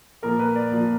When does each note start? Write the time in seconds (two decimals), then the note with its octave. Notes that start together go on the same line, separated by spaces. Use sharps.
0.23 A#2 F3 A#3 A#4
0.39 B4
0.56 D5
0.71 A#2 F3 A#3